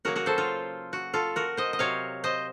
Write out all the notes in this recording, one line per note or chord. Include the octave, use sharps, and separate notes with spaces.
C#3 F#3 A#3 F#4 A#4
F#4 A#4
A4 C5
F4
F#4
F4 A4
F#4 A#4
C5 D#5
D#5
C3 F#3 C4 C#5 F5
C5 D#5